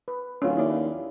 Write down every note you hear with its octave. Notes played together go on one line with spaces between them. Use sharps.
B4
D1 C#4 F4
D#2 E4 D5